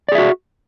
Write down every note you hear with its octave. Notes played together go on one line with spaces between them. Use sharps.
F#4 G#4 D5 E5